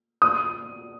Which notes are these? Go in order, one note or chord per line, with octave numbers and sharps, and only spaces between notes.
D#6